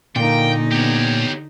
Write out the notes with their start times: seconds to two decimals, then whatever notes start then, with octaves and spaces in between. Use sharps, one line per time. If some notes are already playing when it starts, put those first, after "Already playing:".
0.16 A#2 D3 A#3 D#4 G5
0.71 B3 G4 C#5